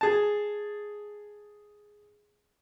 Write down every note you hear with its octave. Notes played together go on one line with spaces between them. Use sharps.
G#4 A5